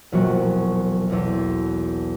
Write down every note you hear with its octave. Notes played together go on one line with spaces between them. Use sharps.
E1 A#1 F#3 F#4
B1 E2